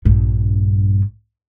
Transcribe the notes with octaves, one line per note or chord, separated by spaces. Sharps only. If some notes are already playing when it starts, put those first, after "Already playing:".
A#1 G2